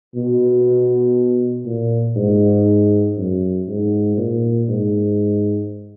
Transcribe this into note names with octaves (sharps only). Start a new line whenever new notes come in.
B2
A#2
G#2
F#2
G#2
A#2
G#2